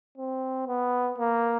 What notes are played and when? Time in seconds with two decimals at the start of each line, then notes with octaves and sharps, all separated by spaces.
0.18 C4
0.68 B3
1.18 A#3